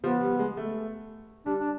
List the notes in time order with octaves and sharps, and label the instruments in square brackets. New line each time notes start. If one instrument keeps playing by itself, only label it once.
[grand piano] F3 [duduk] B3
[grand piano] G3
G#3
A3
[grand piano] G3 [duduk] D4
[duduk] D4